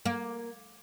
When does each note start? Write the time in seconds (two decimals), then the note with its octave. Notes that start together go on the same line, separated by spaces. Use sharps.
0.06 A#3